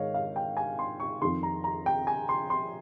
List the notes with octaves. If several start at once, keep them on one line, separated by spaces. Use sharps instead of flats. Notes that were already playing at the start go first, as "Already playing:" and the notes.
Already playing: G#2 D#3 C#5 D#5 F5
F5
G5
G#5
C6
C#6
F2 D#3 C6
A#5
A#5
G5
G#5
C6
C6